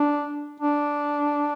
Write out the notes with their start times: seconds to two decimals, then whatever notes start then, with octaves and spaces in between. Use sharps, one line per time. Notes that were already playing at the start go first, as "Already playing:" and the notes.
Already playing: D4
0.60 D4